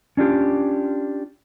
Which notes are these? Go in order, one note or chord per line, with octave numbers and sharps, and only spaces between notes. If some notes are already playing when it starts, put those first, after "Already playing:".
C#4 D4 F4 G4